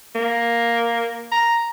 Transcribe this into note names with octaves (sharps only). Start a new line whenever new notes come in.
A#3
A#5